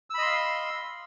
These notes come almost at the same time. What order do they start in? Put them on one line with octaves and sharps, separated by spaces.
E6 B5 D#5 C6 F5